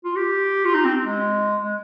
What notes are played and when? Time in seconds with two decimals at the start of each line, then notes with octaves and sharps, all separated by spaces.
0.04 F4
0.16 G4
0.65 F4
0.75 D#4
0.85 C4
1.04 G#3
1.62 G#3